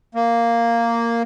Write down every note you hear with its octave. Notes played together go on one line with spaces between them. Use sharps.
A#3